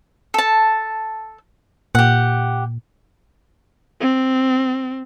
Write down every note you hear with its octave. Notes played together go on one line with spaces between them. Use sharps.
A4 A5
A#2 G4 F#5
C4